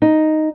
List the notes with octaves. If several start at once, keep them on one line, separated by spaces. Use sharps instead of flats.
D#4